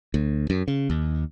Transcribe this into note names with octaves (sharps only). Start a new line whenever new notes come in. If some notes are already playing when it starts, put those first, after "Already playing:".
D2
F#2
C#3
D#2